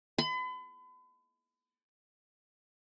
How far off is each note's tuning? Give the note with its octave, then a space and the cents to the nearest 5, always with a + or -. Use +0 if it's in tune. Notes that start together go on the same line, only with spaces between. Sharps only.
B5 +40